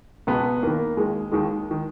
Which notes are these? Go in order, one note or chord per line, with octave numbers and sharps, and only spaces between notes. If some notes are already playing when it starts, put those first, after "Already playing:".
C#2 B2 B3
D#2 D#3 A#3
D#2 D#3 G#3
D#2 D#3 G#3
D#3